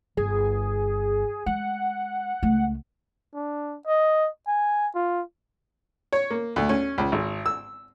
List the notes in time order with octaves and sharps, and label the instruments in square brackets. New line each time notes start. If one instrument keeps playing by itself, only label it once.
[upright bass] G1 [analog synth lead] G#4
[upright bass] G#3 [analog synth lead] F#5
[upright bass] C#2 A3
[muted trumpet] D4
D#5
G#5
F4
[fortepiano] C#5
A#3
D2
C#4
C#2
G#1
E6